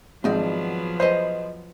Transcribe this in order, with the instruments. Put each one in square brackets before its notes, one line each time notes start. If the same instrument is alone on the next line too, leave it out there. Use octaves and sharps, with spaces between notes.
[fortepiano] G#1 [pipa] D3 D#4 D5 [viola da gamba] F3 F#3 B3
[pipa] G#4 B4 D#5 [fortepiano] C5